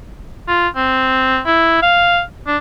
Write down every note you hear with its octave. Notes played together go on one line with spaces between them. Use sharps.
F4
C4
E4
F5
D4